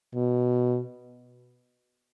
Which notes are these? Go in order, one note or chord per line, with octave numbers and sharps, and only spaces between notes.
B2